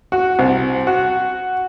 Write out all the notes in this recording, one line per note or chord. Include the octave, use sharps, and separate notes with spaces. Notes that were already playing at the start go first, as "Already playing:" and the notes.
F#4
C2
F#4